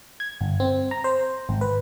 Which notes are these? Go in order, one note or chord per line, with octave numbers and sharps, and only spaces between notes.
G#6
G1
C4
A#5
C5
G#1
B4